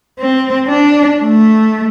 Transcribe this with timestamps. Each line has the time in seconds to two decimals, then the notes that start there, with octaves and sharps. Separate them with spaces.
0.19 C4
0.67 D4
1.23 A3